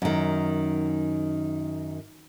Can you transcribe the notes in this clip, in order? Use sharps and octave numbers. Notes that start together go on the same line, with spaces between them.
F#2 D#3